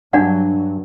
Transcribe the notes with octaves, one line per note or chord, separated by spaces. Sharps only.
G2 F#3 D4 D5 F#5